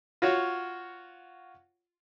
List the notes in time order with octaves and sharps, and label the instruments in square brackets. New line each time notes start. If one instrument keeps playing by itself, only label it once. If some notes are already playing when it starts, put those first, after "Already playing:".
[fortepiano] F4 F#4 C#5